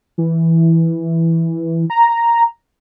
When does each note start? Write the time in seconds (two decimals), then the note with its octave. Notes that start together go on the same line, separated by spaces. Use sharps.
0.18 E3
1.90 A#5